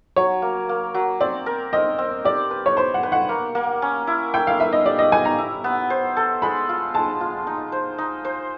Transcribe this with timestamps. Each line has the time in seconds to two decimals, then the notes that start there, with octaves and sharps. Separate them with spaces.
0.16 F#3 C#5
0.42 A#3
0.69 A#3
0.94 F#3
1.20 C4 D5
1.46 A#4
1.73 C4 D#5
1.98 C4
2.25 G4 D5
2.51 B4
2.66 C#5
2.77 B4 C5
2.94 F#5
3.03 B4
3.12 F#5
3.29 A#3
3.55 A#3
3.82 C#4
4.07 E4
4.34 E4 G5
4.47 F5
4.60 B4 E5
4.73 D#5
4.85 G4 D5
4.99 D#5
5.12 B4 G#5
5.25 A#5
5.38 E4
5.64 B3
5.90 C5
6.17 A4
6.42 G#3 B5
6.69 F4
6.94 G#3 A5
7.21 F4
7.47 D#4
7.72 C5
7.98 D#4
8.25 C5